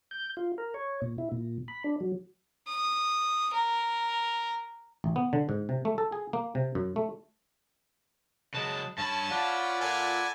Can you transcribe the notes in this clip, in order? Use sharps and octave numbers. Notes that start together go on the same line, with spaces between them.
G6
F4
A#4
C#5
A#2
E4
A#2
B5
D4
F#3
D#6
A#4
A1
B3
D3
G#2
C3
A3
A4
G#4
A#3
C3
F#2
A3
C#3 F#3 G#3 B4 A5
G2 C#4 A5 B5
F4 D5 F#5 B5
A#2 A4 G#5